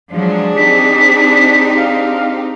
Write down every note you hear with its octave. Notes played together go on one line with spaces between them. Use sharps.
F3 F#3 G#3 D4 G#4
C4 D#4 G4 B6
F5